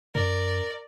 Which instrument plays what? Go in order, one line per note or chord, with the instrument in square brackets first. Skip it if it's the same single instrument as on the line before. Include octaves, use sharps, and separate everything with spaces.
[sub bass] F#2 [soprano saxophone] A#4 [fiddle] D5